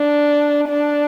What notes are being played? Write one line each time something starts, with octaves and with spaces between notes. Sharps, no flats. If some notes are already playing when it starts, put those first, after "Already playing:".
Already playing: D4
D4